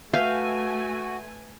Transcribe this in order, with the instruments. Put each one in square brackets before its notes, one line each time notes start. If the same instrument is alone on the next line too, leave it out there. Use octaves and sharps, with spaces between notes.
[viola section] A3 G#5 [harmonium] F#4 [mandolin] B4 E5 G6 [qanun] F5